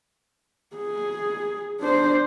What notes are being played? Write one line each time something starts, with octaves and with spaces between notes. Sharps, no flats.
G#4
D4 C5